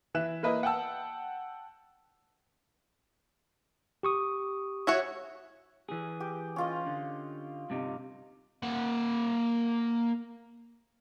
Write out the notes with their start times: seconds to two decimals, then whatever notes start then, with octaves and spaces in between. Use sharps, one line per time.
0.14 E3 E5 F#6 E7
0.43 A#3 E4 B4 D#5
0.63 F#5 G5 A5 E6
4.03 G4 C#6 D#6
4.87 E4 F#4 C#5
5.89 E3 G#4
6.20 G4
6.56 C#4 F4 D#5
6.87 D3
7.70 G2 C3 D#4
8.62 A#3 F#5